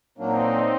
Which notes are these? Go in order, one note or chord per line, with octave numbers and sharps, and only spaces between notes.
A#2 F#3 A#3 C4 D4 D#4